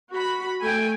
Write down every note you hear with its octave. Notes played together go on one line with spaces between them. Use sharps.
F#4 B5
A3 G5 G#5